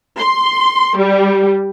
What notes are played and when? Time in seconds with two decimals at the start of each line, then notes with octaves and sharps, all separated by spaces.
0.18 C6
0.97 G3